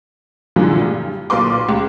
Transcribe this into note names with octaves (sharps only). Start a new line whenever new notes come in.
F#2 A#2 D3 E3 F3 G#3
G2
B1 A#2 A#3 B4 C6 D6
C#2